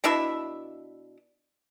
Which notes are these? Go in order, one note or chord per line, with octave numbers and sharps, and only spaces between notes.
B2 D4 E4 E5